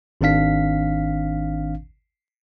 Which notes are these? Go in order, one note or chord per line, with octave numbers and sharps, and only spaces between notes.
G#1 D#3 C4 D4 F5 B6